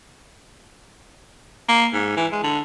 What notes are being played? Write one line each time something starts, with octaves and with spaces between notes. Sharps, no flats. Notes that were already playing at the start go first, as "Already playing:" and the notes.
A#3
G#2
E3
G#3
D3